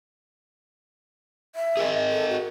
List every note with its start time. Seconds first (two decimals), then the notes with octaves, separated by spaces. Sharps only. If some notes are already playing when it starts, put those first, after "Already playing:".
1.55 E5
1.77 G#4 A#4 D#5
2.11 A4
2.30 F#4